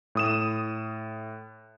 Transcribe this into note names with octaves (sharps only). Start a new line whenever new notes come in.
A2 D#6 E7